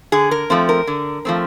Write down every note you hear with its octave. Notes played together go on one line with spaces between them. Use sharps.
D3 G#4
A#4
F3 A3 C4
A#4
D3
F3 A3 C4